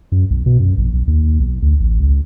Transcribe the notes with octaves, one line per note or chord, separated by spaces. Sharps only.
F#2
B1
B2
F#2
A#1
B1
D#2
B1
D2
A1
C#2